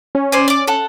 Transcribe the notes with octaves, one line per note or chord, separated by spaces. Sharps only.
C#4
C5 D5 G#5
D5 D6
A4 F#5